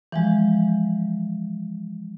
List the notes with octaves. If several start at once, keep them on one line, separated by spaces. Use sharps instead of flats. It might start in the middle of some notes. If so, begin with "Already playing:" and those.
E3 F3 G#3